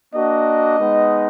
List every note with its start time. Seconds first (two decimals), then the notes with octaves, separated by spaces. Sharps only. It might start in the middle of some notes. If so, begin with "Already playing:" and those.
0.13 A#3 D4 F#4 D#5
0.79 G#3 B3 D#4